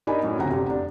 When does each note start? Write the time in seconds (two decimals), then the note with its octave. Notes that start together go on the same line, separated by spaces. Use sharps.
0.07 D4 D#4 A#4 D#5 G#5 B5
0.23 F#2 A2
0.39 D2 C#3 C4 F#5 A#5
0.51 F1 G4
0.70 D4